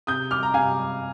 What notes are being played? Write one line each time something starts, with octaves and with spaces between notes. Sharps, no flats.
C3 D#6 G6
G3 D6 F6
A#5
C3 F5 G#5
G3